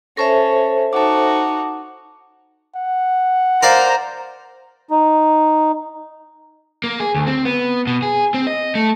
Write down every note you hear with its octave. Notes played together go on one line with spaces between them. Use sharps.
C#4 A4 C5 E5 A5 C#6 A#6
D#4 F#4 A5 D6
F#5
A#4 C5 D5 F5 A#5
D#4
A#3
G#4
D2
C4
B3
B2
G#4
C4
D#5
A3